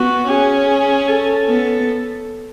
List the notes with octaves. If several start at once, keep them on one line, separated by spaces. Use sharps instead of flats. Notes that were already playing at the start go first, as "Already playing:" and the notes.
Already playing: B3 F#4
C#4 G#4
G#4
A4
B3